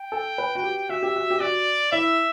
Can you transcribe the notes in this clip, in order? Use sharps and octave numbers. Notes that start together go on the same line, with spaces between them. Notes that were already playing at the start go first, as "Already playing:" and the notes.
Already playing: G5
A4
B4
F#4
G4
F#4 E5
G4
F#4
G4
F#4 D5
E4 E5